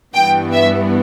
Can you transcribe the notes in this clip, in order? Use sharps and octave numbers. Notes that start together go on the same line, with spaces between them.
G2 E3 B3 G5
E5